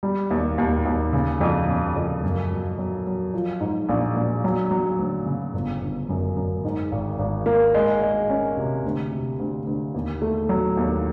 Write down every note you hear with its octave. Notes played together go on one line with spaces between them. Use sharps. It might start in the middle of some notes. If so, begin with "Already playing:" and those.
G3
D#2
D#2
D#2
C#3
F2
C#3
F2
F#2
F#3
F#3
F#3
F3
G#2
A#1
A#1
F#3
F#3
D2
C#3
G1
G1
F#2
F#2
G#2
G#1
G#1
A#3
G#3
G#3
C#4
C3
D2
C3
D2
D2
D#2
A3
F#3
D#2